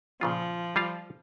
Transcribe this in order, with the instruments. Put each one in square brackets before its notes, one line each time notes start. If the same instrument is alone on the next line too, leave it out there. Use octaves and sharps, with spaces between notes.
[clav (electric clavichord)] A#2 C#3 F4 [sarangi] F3
[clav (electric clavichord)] G3 F4 F5